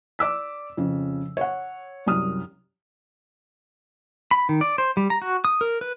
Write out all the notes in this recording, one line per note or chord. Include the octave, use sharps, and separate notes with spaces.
D5 D6 E6 B6
F2 C#3
C#5 F#5
C2 F#2 D#6 F6
B5
D#3
D5
C5
G3
A#5
F#4
D#6
A#4
B4